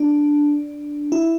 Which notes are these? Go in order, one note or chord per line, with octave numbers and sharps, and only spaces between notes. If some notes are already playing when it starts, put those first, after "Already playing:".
Already playing: D4
E4